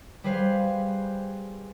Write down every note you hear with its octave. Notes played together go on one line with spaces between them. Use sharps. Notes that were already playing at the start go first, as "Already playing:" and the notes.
G3 G#4 B4 C5 F5